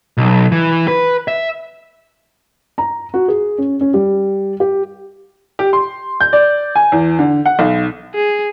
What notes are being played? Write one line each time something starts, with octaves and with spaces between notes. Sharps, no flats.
B1
E3
B4
E5
A#5
F#4
G#4
C#4
C#4
G3
G4
G4
C6
G6
D5
G#5
E2
D3
F#5
B1
G#4